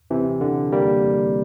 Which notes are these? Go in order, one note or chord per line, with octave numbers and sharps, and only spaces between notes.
C3 E3
D3
G3 A#3